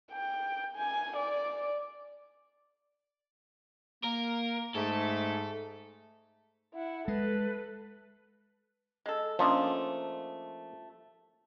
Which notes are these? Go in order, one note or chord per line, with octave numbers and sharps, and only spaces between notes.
G5
G#5
D5
A#3 A#4
G#2 A3 A4
E4 F#5
G#3 A4 B4
G#3 A4
F3 A3 A#3 C#4 D4 D#5